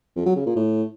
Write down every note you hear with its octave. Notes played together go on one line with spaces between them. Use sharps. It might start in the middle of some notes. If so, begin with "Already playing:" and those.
F2
F#3
C#3
A#2
A2